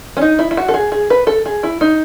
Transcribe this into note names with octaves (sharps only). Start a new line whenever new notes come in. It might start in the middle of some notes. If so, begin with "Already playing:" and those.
C#4
D#4
E4
E4
F#4
A4
G#4
G#4
B4
A4
G#4
E4
D#4